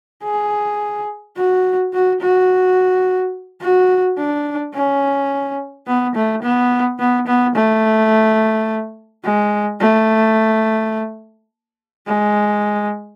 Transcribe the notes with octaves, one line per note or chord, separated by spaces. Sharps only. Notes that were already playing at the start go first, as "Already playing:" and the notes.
G#4
F#4
F#4
F#4
F#4
D4
C#4
B3
A3
B3
B3
B3
A3
G#3
A3
G#3